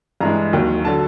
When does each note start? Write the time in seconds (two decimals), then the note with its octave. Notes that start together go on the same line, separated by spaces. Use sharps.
0.21 G2 E3 G#3 A#5
0.53 D#2 D#3 F#3
0.85 D3 F#3 A5